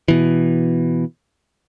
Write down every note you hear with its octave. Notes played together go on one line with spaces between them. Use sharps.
B2 E3